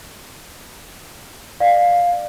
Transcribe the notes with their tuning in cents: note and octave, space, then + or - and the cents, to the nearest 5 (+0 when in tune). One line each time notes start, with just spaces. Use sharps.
D5 +25 F5 +10